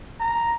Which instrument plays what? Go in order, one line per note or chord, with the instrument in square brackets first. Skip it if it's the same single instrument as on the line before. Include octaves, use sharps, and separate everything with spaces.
[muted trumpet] A#5